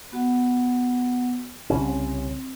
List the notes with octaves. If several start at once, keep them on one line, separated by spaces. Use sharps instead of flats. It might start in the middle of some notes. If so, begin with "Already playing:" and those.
B3 F#4 F#5
C2 C#3 C4 C#4